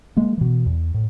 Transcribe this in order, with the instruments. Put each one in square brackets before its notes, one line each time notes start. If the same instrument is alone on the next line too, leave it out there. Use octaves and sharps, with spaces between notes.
[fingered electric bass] G#3 A#3
B2 E3
E2
A2